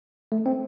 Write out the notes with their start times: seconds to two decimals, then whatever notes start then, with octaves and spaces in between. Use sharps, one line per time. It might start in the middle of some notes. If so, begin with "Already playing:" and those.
0.32 A3
0.46 C4